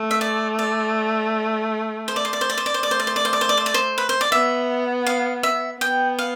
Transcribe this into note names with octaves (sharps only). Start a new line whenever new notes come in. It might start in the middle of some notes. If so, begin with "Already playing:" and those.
Already playing: A3
E5
D5
D5
C5
D5
C5
D5
C5
D5
C5
D5
C5
A3 D5
C5
D5
C5
D5
C5
D5
C5
D5
C5
D5
C5
B4
C5
D5
B3 E5
F5
E5
B3 G5
F5